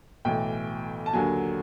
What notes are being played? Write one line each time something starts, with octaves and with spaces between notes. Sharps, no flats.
B1 A2 E3 G5
A5
D#2 D3 F#3 G#5